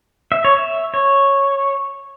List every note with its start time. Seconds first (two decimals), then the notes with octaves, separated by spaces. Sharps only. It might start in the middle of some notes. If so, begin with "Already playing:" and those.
0.32 E5
0.45 C#5
0.57 E5
0.94 C#5